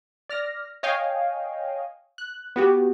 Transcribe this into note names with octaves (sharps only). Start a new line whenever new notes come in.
D5 F6 A#6
C#5 D#5 F5 G5 G#5
F#6
B3 F#4 G4